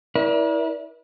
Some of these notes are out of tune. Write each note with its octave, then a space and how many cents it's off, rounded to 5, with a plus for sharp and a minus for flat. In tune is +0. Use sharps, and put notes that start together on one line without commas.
E4 -15 A#4 +40 D5 -20